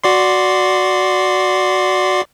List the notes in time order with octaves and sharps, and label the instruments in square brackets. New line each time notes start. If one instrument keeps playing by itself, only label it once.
[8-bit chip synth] F#4 D5 C6